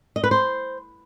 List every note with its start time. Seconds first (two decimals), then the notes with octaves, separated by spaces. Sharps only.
0.16 D#5
0.24 B4
0.31 C5